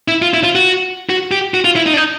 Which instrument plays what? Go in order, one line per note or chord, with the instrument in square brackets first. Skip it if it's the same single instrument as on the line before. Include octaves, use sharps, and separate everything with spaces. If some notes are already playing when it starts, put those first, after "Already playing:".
[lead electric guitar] E4
F4
E4
F4
F#4
F#4
G4
F#4
F4
E4
D#4
D4
D#4